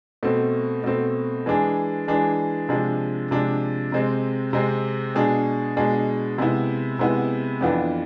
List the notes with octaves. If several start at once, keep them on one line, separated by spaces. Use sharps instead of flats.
B2 A3 C4
B2 A3 C4
E3 G#3 D4 G#4
E3 G#3 D4 G#4
C3 F3 G#3 D4
C3 F3 G#3 D4
C3 G#3 C4
C3 G#3 C4
B2 G#3 D4 G#4
B2 G#3 D4 G#4
C3 G#3 B3 E4
C3 G#3 B3 E4
F2 E3 B3 D4 F4